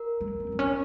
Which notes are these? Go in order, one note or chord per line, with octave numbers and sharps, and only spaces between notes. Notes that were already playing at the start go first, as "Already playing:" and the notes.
Already playing: A#4
G#3
C4
C4
C#4